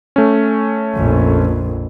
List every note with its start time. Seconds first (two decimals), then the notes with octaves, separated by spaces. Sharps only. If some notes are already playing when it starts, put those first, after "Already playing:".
0.16 A3 C#4
0.96 A#1 F2